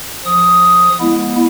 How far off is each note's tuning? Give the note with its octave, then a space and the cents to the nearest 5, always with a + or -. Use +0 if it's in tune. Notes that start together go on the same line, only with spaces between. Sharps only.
F3 +0 D#6 +5
G#3 +0 B3 -30 E4 +0